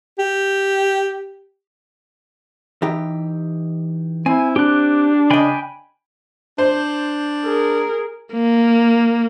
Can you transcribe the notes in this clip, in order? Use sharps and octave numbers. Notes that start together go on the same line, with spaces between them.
G4
E3 D#4 G4
C4 E4 G#5
D4 G4 F#6
C#3 D#5 G5 G#5 B5
D4 C5
G#4 A#4
A#3